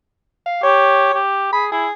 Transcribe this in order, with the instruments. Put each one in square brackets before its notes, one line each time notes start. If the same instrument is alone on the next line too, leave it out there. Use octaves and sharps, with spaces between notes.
[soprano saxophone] F5
[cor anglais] G4 [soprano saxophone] C#5
[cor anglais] G4
[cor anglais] G#4 [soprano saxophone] B5
[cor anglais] E4 [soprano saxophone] G#4